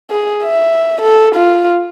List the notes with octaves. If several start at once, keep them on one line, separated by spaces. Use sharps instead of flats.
G#4
E5
A4
F4